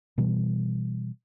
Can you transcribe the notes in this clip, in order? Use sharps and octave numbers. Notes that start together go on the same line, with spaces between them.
B2 E3 G3